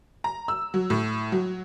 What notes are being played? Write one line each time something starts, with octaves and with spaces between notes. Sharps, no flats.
A#5
E6
F#3
A2
F#3